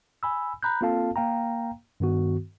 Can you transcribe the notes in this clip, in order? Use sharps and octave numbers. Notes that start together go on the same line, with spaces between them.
G#5 B5 E6
A#5 B5 F#6 G6
A#3 C4 F4 A4 F5 A5
A#3 F5 G5 A#5
G2 D#3 B3 F#4